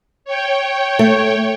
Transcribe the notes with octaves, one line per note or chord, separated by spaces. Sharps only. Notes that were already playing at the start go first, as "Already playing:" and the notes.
C#5 G5
A3